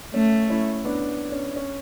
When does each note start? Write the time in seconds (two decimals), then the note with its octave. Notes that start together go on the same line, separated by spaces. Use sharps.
0.14 A3 C#4
0.50 C#4 E4
0.85 B3 D4
1.32 C#4
1.56 C#4